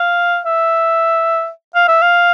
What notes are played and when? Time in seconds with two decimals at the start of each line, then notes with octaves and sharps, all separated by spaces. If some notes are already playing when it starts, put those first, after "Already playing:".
Already playing: F5
0.46 E5
1.75 F5
1.88 E5
2.02 F5